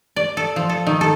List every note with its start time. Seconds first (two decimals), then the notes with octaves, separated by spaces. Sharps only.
0.16 D5
0.37 A4
0.56 F3
0.69 A4
0.87 D#3
1.01 A4